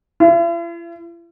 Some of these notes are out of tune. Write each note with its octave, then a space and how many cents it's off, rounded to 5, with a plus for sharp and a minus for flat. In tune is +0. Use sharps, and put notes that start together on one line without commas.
E4 +45